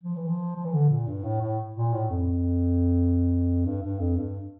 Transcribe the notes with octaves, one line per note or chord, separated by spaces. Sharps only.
F3
E3
F3
F3
E3
D3
A#2
G2
A2
A2
A#2
A2
F2
G2
G2
F2
G2